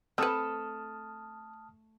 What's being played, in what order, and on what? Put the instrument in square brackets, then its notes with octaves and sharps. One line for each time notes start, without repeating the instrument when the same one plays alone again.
[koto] A3 A4 [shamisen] C4 B4 [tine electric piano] A5 D#6 F6